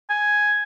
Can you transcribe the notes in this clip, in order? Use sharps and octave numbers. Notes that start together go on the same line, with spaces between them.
G#5